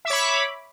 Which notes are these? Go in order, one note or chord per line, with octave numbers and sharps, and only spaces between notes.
C#5 E5 B5 D6